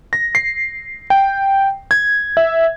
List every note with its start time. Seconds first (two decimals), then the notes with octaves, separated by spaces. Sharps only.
0.13 A#6
0.35 C7
1.10 G5
1.91 G#6
2.37 E5